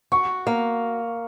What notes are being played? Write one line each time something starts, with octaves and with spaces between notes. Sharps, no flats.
F#4 C#6
A#3